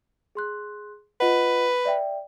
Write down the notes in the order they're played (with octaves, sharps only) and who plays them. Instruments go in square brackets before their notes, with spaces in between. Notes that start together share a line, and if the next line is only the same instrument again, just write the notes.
[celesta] G#4 C6 F#6
[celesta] F4 D#5 F#5 [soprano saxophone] B4
[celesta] D5 E5 G5